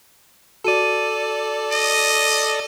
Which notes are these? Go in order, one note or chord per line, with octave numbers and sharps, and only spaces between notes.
F#4 A4 D5 D#7
D#5